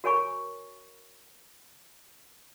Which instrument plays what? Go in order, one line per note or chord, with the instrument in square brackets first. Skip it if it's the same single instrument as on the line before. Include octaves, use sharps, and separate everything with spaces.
[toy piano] F#4 A#4 C#5 G#5 B5 C#6